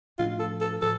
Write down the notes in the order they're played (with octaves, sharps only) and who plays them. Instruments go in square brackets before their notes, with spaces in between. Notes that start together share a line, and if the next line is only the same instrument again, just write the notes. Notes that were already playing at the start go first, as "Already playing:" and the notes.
[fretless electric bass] A2 F3 A3 D4 [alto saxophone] F4
[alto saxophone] A4
A4
[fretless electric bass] A2 F3 [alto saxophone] A4